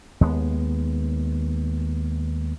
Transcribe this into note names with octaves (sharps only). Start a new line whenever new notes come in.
D#2 G#3 B3